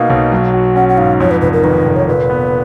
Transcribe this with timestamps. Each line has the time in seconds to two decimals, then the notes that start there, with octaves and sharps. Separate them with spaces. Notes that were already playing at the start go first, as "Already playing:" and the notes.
Already playing: B2 A#3 D#4 F5
0.10 B1
0.32 F#3
0.53 F#4
0.75 C#4 F#5
0.89 F#5
0.98 G#2 F5
1.20 F2 C#5
1.31 B4
1.41 F1 B4
1.53 A#4
1.64 D#3 B4
1.85 F1
1.96 C#5
2.08 A#2 B4
2.30 B3